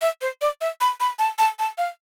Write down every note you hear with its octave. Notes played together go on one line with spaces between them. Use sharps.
E5
C5
D5
E5
B5
B5
A5
A5
A5
F5